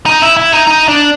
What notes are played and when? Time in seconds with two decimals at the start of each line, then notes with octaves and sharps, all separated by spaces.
0.06 D#4
0.22 E4
0.37 E4
0.52 D#4
0.67 D#4
0.88 D4